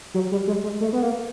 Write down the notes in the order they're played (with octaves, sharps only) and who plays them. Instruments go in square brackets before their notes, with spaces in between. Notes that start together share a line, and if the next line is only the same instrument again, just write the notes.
[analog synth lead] F#3
G3
G#3
G#3
A3
B3
A#3